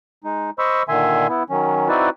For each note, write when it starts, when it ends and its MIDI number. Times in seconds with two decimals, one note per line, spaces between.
0.24 0.50 56
0.24 0.50 63
0.59 0.83 72
0.59 0.83 75
0.59 0.83 83
0.59 0.83 85
0.59 0.83 88
0.89 1.27 46
0.89 1.27 50
0.89 1.27 51
0.89 1.27 76
0.89 1.27 80
0.89 1.27 84
1.28 1.43 59
1.28 1.43 64
1.50 1.88 51
1.50 1.88 54
1.50 1.88 61
1.88 2.09 60
1.88 2.09 63
1.88 2.09 64
1.88 2.09 66
1.88 2.09 71
1.88 2.09 74